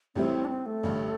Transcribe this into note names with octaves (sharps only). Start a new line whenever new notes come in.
A1 A2 G3 C4 E4 G4
D4
C4
A3
A1 G2 D3